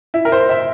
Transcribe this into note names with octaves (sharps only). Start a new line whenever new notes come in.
E4
A#4
C5
E5